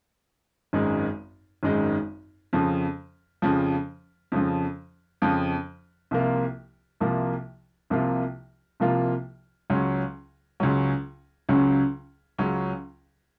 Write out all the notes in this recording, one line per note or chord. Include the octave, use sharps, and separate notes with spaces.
G#1 F#2 D#3 G#3 D#4
G#1 F#2 D#3 G#3 D#4
F2 C#3 F3
F2 C#3 F3
F2 C#3 F3
F2 C#3 F3
C2 C3 F3 A#3 F4
C2 C3 F3 A#3 F4
C2 C3 F3 A#3 F4
C2 C3 F3 A#3 F4
C#2 C#3 F#3 C#4
C#2 C#3 F#3 C#4
C#2 C#3 F#3 C#4
C#2 C#3 F#3 C#4